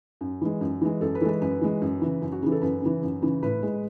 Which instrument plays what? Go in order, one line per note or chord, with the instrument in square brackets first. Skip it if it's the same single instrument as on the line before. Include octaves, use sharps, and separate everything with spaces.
[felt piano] F#2
E3 G#3
F#2
E3 G#3
F#2 A4
B4
E3 A4
G#3 B4
F#2 B4
E3 G#3
F#2
C#3 E3
F#2
F#4
C#3 E3 G#4
A4
F#2 B4
C#3 E3
F#2
C#3 E3
A2 B4
G#3